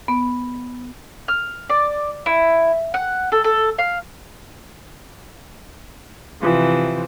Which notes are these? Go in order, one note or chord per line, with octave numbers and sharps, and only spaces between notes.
B3
F6
D5
E4
F#5
A4
A4
F5
C3 E3 F3